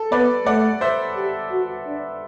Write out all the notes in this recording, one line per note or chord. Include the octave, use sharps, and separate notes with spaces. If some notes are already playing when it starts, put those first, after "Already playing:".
Already playing: A4
B3 B4 D5
A3 D5 F#5
C5 E5
G4
F#4
D4